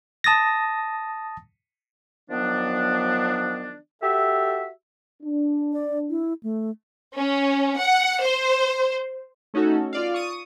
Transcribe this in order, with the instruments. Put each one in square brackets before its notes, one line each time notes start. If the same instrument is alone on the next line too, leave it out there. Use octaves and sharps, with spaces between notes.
[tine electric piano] A5 D#6 A6 A#6
[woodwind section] D#3 F3 F#3 B3 D4
F#4 G4 A4 E5
[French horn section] D4
[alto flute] D5
E4
A3
[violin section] C#4
F#5
C5
[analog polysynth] A3 C#4 D#4 F#4 A4
F4 D5 F5
C#6 D#6 D#7